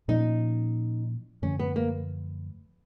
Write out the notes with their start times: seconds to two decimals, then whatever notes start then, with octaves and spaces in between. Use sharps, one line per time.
0.08 A#2 F3 A#3 C#4 D#4
1.42 F#2 D3 F3 A3 C#4
1.59 B3
1.76 A#3